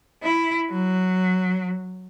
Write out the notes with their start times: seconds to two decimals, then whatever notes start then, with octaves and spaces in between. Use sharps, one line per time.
0.23 E4
0.71 F#3